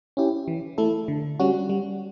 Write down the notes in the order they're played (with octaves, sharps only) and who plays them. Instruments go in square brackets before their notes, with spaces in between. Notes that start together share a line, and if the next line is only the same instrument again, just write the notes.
[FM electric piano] C#4 E4 G4
E3
A3 E4 A4
D3
G3 C#4 F#4
G3